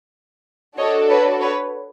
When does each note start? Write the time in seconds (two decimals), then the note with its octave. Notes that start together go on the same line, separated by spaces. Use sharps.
0.78 D4 F#4 A4 C#5 D#5
1.10 B4 C#5
1.41 B4 C#5